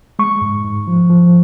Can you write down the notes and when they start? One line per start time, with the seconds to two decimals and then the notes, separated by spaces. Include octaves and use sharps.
0.19 G#3 C#6
0.42 G#2
0.65 G#2
0.87 F3
1.10 F3